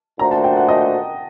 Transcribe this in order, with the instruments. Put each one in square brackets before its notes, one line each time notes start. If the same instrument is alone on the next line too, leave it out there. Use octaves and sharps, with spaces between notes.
[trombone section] A#2 A3 D4 F#4 C5 [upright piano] A#5
[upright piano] A5
G5
F#5
D#5